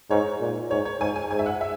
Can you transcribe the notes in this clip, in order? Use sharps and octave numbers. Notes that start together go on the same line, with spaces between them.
G#2 C#5
A#2
G#2 C#5
C#5
G#2 G#5
G#5
G#2 G#5
E5
F#5
E5